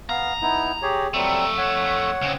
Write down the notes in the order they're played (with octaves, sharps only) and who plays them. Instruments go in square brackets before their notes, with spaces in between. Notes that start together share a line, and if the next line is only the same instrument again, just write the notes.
[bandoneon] B3 F5 [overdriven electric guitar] A#5
[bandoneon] B3 D#4 E4
G4 G#4 C#5
[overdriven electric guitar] F2 A3 [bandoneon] F#3 G3 C4
[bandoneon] C#5 F#5
[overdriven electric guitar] C#3 C4